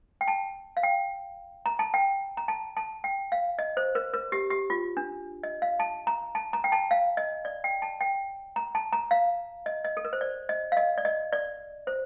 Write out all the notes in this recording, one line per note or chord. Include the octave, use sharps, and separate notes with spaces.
G5
A5
F5
G5
A#5
A5
G5
A#5
A5
A5
G5
F5
D#5
C5
A#4
A#4
G4
G4
F4
D4
D#5
F5
A5
A#5
A5
A#5
G5
A5
F5
D#5
D5
G5
A5
G5
A#5
A5
A#5
F5
D#5
D#5
A4
A#4
C5
D5
D#5
F5
D#5
D5
D#5
D5
C5